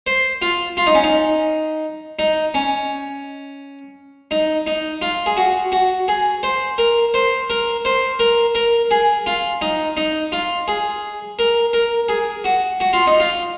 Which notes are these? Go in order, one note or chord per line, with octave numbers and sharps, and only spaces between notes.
C5
F4
F4
D#4
C#4
D#4
D#4
C#4
D#4
D#4
F4
G#4
F#4
F#4
G#4
C5
A#4
C5
A#4
C5
A#4
A#4
G#4
F4
D#4
D#4
F4
G#4
A#4
A#4
G#4
F#4
F#4
F4
D#4
F4